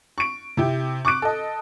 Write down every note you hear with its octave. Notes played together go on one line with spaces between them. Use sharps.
C#6 D7
C3 E4 G4
C#6 D6 F#6 D7
A4 D#5